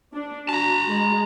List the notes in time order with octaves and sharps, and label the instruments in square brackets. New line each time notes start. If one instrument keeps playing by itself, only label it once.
[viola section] D4
[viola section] F#4 [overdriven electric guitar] A5 A#5
[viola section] G#3